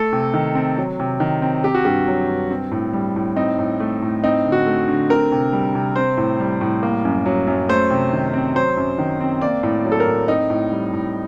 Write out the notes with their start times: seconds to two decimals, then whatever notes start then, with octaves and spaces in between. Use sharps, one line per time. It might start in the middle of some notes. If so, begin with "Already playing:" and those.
Already playing: A3 A4
0.12 C3
0.34 D#3
0.55 C4
0.78 F#3
0.99 C3
1.20 D#3
1.42 C4
1.64 C4 G4
1.75 F#4
1.85 G2 G4
2.08 F#3
2.28 G2
2.51 C4
2.71 A2
2.93 G3
3.16 A2
3.36 C4 D#4
3.58 A2
3.80 A3
4.02 A2
4.24 C4 D#4
4.45 D3
4.52 F#4
4.66 A3
4.88 D3
5.09 C4 A#4
5.32 C3
5.53 G3
5.75 C3
5.96 C4 C5
6.17 A2
6.40 G3
6.61 A2
6.83 A#3
7.05 F#2
7.26 F#3
7.47 F#2
7.69 A3 C5
7.90 C3
8.12 D#3
8.34 C4
8.55 F#3 C5
8.77 F#2
8.98 D#3
9.21 C4
9.41 A#3 D5
9.63 A2
9.85 F#3
9.92 A4
10.00 A#4
10.07 A2
10.28 C4 D#4
10.50 A2
10.72 G3
10.93 A2